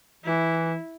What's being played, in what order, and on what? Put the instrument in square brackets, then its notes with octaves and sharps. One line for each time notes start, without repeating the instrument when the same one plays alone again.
[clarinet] E3 [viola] E4